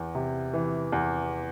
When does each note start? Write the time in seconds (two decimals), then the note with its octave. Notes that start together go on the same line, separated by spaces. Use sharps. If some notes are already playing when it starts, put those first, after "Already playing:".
Already playing: E2
0.15 C3
0.53 E3
0.92 E2